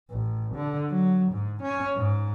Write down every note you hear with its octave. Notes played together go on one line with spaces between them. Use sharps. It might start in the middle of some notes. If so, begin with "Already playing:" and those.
A1
D3
F#3
G#2
C#4
G#2